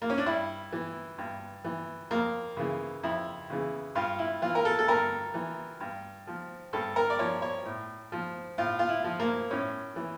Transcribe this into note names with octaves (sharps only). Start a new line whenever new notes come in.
A#3
C#4
D4
G2 E4
E3
G2
E3
F2 A#3
C#3 E3
F2 E4
C#3 E3
G2 F4
E4
E3 F4
A#4
A4
A4
G2 A#4
E3
G2
F3
G2 A4
A#4
D5
F3 C#5
C#5
A2
F3
A2 F4
F4
E4
F3
A#3
A2 C#4
E3